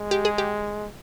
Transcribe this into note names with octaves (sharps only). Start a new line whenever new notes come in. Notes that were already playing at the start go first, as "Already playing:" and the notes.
Already playing: G#3
G4
G#4
G4